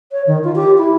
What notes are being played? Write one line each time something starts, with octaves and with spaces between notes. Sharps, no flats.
C#5
D#3
F4
G4
E4